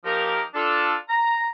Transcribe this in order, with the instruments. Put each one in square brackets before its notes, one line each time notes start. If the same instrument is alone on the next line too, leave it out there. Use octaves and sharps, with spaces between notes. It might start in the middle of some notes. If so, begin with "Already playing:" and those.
[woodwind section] F3 A#3 D#4 G4 A#4
D4 F4 A4
A#5